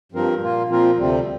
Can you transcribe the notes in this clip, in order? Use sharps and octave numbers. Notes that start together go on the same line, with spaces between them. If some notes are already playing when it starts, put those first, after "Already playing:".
G2 F3 C4 A#4
A#2 A#3 F4
A#2 F3 C4 F4 A#4
D2 C3 G3 C4